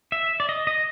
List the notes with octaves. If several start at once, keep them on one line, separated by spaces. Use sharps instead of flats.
E5
D5
D#5
D#5